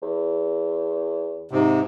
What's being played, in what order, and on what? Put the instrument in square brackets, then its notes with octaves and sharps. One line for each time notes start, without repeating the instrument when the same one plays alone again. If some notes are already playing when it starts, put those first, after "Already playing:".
[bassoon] E2
[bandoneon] G#2 C3